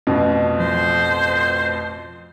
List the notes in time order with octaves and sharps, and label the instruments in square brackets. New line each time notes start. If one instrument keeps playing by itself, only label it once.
[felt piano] A1 F2 B2 [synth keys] C#4
[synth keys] F3 [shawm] C5